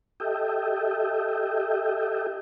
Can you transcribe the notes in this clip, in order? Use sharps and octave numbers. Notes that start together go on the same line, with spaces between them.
G4 A4 D#5 E5 G5